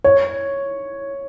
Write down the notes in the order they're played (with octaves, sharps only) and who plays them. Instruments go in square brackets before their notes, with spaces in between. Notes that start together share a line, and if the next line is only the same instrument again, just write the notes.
[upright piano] C#5